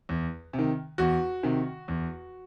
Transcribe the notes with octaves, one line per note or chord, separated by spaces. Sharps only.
E2
C3
D#3
E2 F#4
C3 D#3
E2